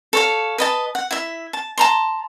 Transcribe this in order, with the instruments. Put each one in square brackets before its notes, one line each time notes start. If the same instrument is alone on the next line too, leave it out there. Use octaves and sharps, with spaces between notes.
[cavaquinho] A4 C#5 F5
B4 D#5 A5
F#5
E4 E5
A5
A5 A#5 C6